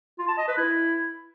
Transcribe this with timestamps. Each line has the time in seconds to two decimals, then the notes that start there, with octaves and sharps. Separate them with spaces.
0.19 F4
0.28 A5
0.38 D#5
0.48 B4
0.58 E4